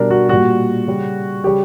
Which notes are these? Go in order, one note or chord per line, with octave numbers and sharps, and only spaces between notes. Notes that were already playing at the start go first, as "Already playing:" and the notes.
Already playing: B2 G3 D4 A#4
F#4
A#2 G3 F#4
C#3 G3
C#3 G3 G4